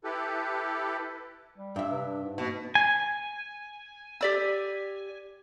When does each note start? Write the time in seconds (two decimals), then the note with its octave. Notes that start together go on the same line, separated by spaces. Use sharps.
0.04 E4 G4 A4 B4
1.58 G3
1.76 G2 D4 E5
1.91 C3 B4
2.06 D4
2.23 G#2
2.38 B2 A#3
2.75 G#5
4.21 G4 D5 E6